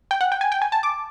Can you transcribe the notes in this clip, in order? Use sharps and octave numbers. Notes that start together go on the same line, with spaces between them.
G5
F#5
G5
G#5
G5
G#5
A5
D6